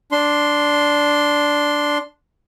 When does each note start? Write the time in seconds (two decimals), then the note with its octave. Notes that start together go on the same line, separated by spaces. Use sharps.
0.12 D4 C6